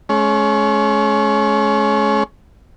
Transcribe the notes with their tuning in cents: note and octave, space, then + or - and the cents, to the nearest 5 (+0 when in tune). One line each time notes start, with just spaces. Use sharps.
G#3 +40 C#4 +0